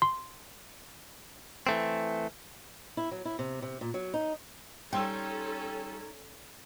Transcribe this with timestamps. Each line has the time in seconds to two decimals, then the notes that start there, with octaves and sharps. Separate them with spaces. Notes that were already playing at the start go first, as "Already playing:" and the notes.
0.02 C6
1.67 E3 A3 C4
2.97 E4
3.11 F#3
3.25 E4
3.39 C3
3.62 C3
3.81 A#2
3.94 F#3
4.14 D#4
4.93 G3 C#4 D#4 A4 G5 C6 E6